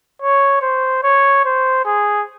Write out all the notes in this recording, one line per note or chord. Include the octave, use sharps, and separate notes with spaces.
C#5
C5
C#5
C5
G#4